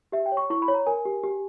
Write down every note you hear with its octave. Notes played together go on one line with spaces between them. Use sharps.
G4 E5
G5
C#5
C#6
E4 C#6
B5
C#5
A#5
A#4 G#5
G4
G4